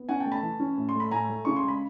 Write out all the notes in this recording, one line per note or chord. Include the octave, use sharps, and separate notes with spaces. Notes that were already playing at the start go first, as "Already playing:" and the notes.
Already playing: B3
C#4 F#5 G#5
G5 A5
A3
A5 B5
E3
C#4
A2
C6
A3 B5
A2 G#5 A#5
A3
C#3 C#6
C6
G#3 B5